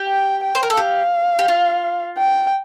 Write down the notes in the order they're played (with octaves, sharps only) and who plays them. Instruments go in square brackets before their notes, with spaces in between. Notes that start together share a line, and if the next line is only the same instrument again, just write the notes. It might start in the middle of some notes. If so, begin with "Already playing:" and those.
Already playing: [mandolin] G4
[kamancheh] G5
G5
[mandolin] C5
A#4
A4
[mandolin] G4 [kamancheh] F5
[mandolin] G4
F4
[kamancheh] G5